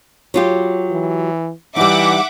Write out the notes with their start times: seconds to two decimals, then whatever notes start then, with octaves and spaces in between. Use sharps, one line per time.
0.34 F#3 F4 G4
0.91 E3
1.76 E3 G3 D#4 E5 F#5 D6